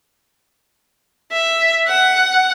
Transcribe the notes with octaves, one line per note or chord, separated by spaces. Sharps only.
E5
F#5